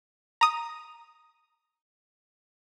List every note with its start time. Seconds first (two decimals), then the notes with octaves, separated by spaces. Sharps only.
0.41 A#5 D#6